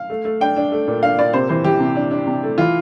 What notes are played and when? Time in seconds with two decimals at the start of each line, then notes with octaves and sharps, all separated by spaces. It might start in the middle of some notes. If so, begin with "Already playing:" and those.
Already playing: F5
0.10 A3
0.25 A3
0.40 D4 G5
0.57 D4
0.72 A3
0.88 A#2
1.03 D4 F5
1.18 A#2 D5
1.33 C3 C5
1.49 E3 C5
1.64 E3 G4
1.80 C3
1.95 D4
2.11 D4
2.26 C3
2.43 A3
2.58 E3 F4